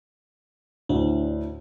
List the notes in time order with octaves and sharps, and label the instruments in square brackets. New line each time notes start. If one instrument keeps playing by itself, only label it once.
[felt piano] D2 A2 [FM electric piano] D4